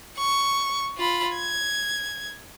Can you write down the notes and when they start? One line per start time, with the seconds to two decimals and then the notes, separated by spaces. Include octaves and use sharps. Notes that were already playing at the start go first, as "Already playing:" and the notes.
0.18 C#6
0.97 F4 B5
1.35 G#6